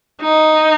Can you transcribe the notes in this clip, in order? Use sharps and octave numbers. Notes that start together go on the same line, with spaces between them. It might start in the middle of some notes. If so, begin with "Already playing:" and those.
D#4